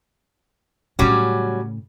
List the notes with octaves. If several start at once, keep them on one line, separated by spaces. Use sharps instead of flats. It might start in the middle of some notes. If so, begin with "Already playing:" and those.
A2 C#3 F#3 G3 C#4